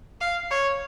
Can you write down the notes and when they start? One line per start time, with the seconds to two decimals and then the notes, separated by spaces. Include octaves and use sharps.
0.21 F5
0.51 C#5